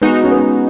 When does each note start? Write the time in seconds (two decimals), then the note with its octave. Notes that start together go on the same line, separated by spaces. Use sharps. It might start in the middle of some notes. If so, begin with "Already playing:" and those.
0.02 G#3 B3 D#4 F#4
0.24 C#4
0.32 B3